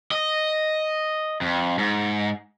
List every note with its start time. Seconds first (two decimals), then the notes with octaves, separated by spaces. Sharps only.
0.11 D#5
1.41 F2
1.79 G#2